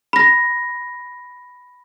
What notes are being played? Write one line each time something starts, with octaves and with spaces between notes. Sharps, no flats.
B5 A#6